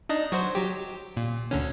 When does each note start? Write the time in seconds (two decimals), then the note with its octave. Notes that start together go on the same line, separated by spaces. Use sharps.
0.09 D4 D#4 D#5
0.32 F#3 F#4 C5
0.55 F#3 G4
1.17 A#2
1.51 D2 D3 C#4